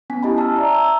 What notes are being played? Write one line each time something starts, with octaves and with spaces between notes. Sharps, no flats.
B3 C#4 G#5 B6
E4 G4 D#5 G#5 A5 B5
G#5 A5 E6 F6
D5 E5 A#5
E6